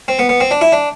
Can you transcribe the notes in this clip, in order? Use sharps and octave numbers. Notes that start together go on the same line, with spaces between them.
C4
B3
B3
C4
D4
E4
D4